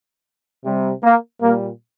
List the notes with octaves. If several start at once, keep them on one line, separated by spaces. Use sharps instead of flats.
C3 G3
A#3
A#2 G3 A#3